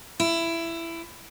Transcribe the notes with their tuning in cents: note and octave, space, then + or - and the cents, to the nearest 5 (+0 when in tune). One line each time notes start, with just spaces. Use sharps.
E4 +15